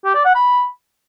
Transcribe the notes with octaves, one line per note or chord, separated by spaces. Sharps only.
G4
D5
F#5
B5